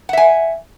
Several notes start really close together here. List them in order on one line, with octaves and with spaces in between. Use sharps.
F#5 E5 G#5